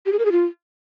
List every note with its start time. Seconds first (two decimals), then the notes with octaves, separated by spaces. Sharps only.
0.06 G4
0.12 G#4
0.19 A#4
0.25 G#4
0.32 F4